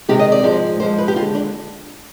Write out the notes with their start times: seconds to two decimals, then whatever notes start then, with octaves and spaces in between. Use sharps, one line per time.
0.09 C3 D#3 G#3 C4 G4
0.19 D#5
0.32 D5
0.43 G#2 F3 G#3
0.80 G#2 F3 G#3 C5
0.98 B4
1.08 G4
1.16 D#2 D3 G#3 F4
1.35 D4